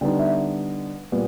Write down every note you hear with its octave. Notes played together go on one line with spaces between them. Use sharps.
D3 G3 B3 D#4 G5
E5
A#2 G3 B3